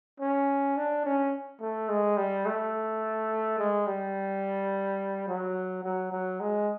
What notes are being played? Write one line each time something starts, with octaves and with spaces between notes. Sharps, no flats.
C#4
D4
C#4
A3
G#3
G3
A3
G#3
G3
F#3
F#3
F#3
G#3